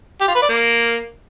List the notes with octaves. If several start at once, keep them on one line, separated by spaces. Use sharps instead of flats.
G4
F4
B4
D5
A#3